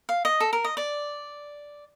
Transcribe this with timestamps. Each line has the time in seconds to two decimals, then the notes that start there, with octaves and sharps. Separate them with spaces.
0.09 F5
0.25 D#5
0.40 A4
0.53 A#4
0.64 D#5
0.77 D5